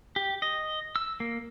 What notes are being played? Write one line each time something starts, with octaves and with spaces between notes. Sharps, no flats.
G4
D#5
E6
A#3